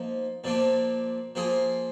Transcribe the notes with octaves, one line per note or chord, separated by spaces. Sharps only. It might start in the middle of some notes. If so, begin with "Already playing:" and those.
Already playing: F3 A#3 D#4
A#2 F3 A#3 D4
F3 A#3 F4 G#4